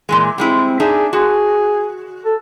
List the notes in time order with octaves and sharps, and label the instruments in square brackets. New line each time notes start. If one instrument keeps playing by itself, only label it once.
[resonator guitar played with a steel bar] A#2 E3 G#3
[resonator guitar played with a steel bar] G3 G#3 E4 [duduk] C4
[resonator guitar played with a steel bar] D4 D#4 E5 [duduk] G#4
[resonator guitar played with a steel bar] F#4 [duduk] G#4
[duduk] A4